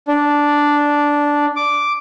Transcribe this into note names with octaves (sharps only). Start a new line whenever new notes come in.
D4
D6